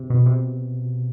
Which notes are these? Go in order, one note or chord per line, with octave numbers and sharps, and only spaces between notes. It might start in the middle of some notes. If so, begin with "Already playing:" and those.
Already playing: C3
B2
C3